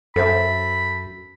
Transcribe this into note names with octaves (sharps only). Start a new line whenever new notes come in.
F#2 A4 C5 E5 B5